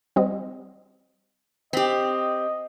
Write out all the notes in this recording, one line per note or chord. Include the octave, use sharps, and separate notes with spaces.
G3 C4 D#5
C4 G4 D#5 B6